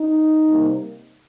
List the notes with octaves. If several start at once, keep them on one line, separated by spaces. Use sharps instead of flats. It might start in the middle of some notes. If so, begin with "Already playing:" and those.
Already playing: D#4
C3 G3 A#3